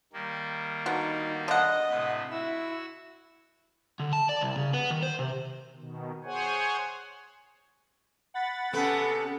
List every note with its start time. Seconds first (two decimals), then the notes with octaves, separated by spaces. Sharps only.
0.13 D#3 G3 A#3
0.86 D3 B3 D#4 F#4
1.48 D3 D#5 F#5
1.90 A2 C3 B4
2.31 E4 F#4 E6
4.00 D3
4.13 A5
4.29 D5
4.41 C2
4.57 C#3
4.73 B3
4.91 D#3
5.03 C5
5.19 C3
5.76 B2 D#3
6.24 G#4 C5 C#5 F#5 G#5
8.34 F#5 B5 A6
8.73 C3 B3 C#4 A4